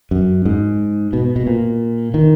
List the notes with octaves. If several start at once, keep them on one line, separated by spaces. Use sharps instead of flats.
F#2
G#2
B2
B2
A#2
D#3